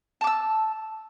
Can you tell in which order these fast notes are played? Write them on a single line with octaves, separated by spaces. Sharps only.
A5 D6 E6